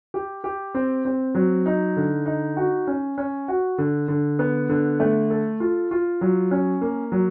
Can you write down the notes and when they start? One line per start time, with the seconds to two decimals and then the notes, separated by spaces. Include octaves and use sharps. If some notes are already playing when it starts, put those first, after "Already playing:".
0.14 G4
0.44 G4
0.74 C4
1.05 C4
1.35 F#3
1.66 D#4
1.97 D3
2.26 D#4
2.57 F#4
2.87 C#4
3.18 C#4
3.48 F#4
3.78 D3
4.08 D3
4.39 B3
4.69 D3
5.00 A3
5.30 A4
5.60 F4
5.91 F4
6.21 F#3
6.51 C#4
6.81 A#3
7.12 F#3